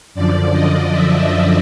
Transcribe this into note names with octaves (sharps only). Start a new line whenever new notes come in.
F#2 D3 F3 D5
D#5
E5